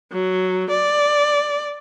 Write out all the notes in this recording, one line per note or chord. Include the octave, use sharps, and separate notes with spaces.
F#3
D5